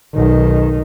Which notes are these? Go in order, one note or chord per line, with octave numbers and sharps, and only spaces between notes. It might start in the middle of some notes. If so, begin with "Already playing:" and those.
B1 D#3